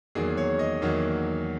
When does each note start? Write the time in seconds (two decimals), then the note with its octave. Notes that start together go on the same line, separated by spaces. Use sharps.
0.15 E2 D#3 F#3 A#3 G#4
0.37 C#5
0.59 D#5
0.81 E2 D#3 F#3 A#3